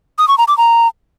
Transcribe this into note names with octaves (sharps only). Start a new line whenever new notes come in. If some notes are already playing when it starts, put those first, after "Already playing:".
D#6
C#6
A#5
D6
A#5